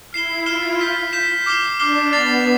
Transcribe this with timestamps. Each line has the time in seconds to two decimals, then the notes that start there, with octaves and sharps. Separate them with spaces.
0.13 E4 F6 C7 E7 G7
0.46 F4 F6 C7 E7 G7
0.79 G6 B6 E7
1.13 G6 B6 E7
1.46 D6 F6 C7 G7
1.79 D4 D6 F6 C7 G7
2.13 B3 A6 C7 F7